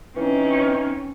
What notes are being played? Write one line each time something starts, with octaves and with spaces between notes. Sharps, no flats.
E3 C4 C#4 D#4